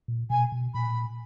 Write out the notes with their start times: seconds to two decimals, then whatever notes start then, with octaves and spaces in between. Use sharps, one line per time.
0.08 A#2
0.30 B2 G#5
0.52 B2
0.74 A#2 B5